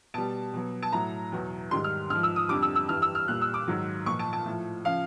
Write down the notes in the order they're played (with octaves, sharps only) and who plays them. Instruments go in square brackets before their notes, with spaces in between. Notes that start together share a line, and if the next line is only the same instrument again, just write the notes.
[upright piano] B2 G3 A5
B2 F#3
A5
A2 F#3 A#5
E2 B2 F#3
G#2 D#3 G3 C6
F6
G#2 F6
F3
E6
D#6
F2 D3 G3 D6
E6
E6
G2 E3 G3 F6
E6
F6
A#2 G3 F#6
E6
D6
G#2 D#3 F#3
A#2 F3 C#6
A5
A5
A2 F3
C#3 F3 F5